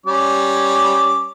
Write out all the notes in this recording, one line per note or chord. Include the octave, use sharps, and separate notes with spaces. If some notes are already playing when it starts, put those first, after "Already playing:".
G3 C#4 D6